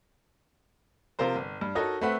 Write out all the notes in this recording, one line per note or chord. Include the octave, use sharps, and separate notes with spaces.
C3 F3 F4 A#4 C5
G1
G2
D#4 F#4 A4 A#4 C#5 D#5
A3 C4 B4 E5 F#5